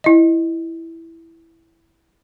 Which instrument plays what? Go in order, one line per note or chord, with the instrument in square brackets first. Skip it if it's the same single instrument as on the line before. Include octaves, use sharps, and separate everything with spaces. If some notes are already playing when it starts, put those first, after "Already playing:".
[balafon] E4 D#5